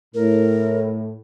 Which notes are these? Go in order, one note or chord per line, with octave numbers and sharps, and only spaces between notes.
A2 A#4